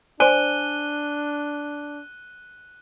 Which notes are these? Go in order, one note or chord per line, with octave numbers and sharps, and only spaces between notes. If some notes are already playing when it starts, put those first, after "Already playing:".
D4 C5 D5 G#5 F#6 D#7 G7